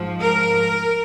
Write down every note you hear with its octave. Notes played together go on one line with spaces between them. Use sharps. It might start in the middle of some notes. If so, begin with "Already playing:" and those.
Already playing: G#2 F3
A#4